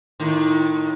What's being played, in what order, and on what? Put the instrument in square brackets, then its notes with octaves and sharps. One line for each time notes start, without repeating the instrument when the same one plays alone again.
[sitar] A2 D#3